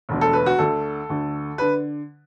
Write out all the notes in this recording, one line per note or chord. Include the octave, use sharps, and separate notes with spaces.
E1 D2 D3
A4
B4
F#4
D2 D3 A4
D2 D3
D3 B4